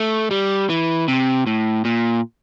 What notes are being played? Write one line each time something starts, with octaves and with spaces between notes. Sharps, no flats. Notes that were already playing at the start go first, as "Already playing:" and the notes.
Already playing: A3
G3
E3
C3
A2
A#2